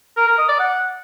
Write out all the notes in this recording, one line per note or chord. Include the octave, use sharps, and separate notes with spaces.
A#4
A#4
D#5
D5
F#5